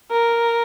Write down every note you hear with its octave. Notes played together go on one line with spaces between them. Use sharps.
A#4